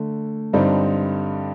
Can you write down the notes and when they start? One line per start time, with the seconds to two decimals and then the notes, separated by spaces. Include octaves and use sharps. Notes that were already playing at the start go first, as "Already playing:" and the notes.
Already playing: D3 A3
0.53 G2 D3 G3 C4 D#4